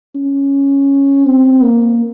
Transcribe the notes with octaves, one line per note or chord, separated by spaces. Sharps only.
C#4
C4
A#3